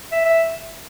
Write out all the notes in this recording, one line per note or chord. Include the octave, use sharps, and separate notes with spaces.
E5
E5